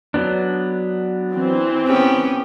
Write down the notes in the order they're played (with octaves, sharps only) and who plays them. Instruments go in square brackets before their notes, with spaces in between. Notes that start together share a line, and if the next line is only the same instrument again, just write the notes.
[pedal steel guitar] F#3 B3 D4
[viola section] E3 C4
[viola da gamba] B3 C#4 G4